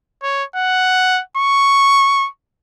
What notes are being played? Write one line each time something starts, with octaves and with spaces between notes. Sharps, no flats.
C#5
F#5
C#6